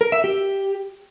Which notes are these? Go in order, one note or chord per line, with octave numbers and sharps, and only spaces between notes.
A#4
E5
G4